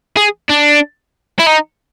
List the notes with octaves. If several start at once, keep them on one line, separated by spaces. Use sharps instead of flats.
G#4
D4
E4
D#4